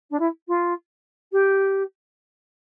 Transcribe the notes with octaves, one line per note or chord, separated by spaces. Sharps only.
D4
E4
F4
G4